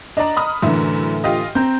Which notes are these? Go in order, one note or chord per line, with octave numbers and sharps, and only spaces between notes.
D4 D5 D#5 A#5
B5 D#6 F6
F#2 A2 D3 E3 E4
F4 G4 D#5
C4 A#5 G6